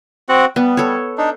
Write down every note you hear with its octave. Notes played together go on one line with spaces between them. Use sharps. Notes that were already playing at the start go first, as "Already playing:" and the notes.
C4 F#4 F#5
G3 B3
A4 C#5
D4 D#4